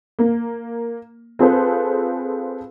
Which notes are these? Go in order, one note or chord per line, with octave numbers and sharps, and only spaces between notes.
A#3
C4 F4 G#4 A4 B4 C5